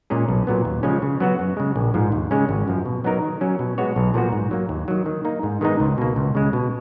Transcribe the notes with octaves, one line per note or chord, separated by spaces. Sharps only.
A#2 G#3 C#4 G#4
B1
A#2 F#3 B3
D#2
C#3 F3 G#3 C#4
C#3
F#3 B3 F#4
F#2
C#3 G#3
A#1
G#2 F3
D#2
C#3 G#3 C#4
G#1
F#2 F3
B2
F#3 B3 D#4 A#4
D#3
F#3 C#4
B2
G#3 B3 F#4 C#5
B1
A#2 F3 B3 F#4
G#2
F#3 A#3
D#2
D#3 F#3
D#3
A#3 D#4
G#2
D#3 G#3 B3 D#4
C#2
B2 A#3
C#2
C#3 G#3
B2